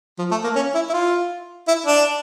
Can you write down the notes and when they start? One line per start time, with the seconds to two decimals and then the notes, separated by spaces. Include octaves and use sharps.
0.19 F3
0.31 A3
0.44 A#3
0.55 C#4
0.75 E4
0.90 E4
0.93 F4
1.68 E4
1.86 D4